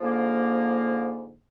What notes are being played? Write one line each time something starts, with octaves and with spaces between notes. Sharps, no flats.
G#2 D3 F3 A#3